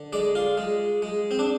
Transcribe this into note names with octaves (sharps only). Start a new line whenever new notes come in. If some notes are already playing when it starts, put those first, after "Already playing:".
Already playing: D3
G#3 D5
F4
G#3
G#3
C4
D4